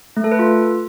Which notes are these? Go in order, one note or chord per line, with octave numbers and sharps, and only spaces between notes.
A3
A4
B4
F4